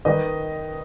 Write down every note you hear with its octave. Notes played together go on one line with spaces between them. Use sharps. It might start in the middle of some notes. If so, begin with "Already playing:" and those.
D#3 B4 D#5